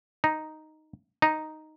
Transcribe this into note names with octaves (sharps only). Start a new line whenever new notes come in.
D#4
D#4